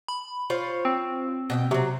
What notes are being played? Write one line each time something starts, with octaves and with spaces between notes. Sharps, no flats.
B5
F4 C5 C#5
C4
B2 G4 G5
C3 F#3 C4